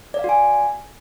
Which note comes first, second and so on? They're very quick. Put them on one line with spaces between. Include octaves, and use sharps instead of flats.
D5 F5 F#4 G#5